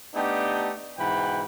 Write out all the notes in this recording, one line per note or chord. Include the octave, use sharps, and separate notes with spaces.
A3 B3 D4 D#4 G4
G#2 B2 E3 F#5 G5 B5